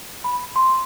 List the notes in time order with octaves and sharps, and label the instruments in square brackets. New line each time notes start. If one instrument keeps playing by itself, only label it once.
[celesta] B5
C6